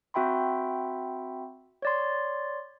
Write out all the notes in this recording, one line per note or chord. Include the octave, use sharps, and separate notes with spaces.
C4 F#4 E5 G5 B5 C6
C#5 D5 C6